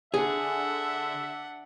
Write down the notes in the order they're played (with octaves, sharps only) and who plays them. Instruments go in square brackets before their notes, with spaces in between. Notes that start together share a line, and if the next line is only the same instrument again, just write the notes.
[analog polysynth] D3 [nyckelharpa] D4 F#5 [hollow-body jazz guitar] G#4 [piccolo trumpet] E5